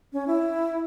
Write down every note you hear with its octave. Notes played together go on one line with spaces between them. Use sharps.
C#4
E4